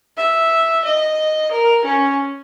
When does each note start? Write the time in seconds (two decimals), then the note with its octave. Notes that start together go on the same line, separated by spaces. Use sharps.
0.17 E5
0.85 D#5
1.51 A#4
1.85 C#4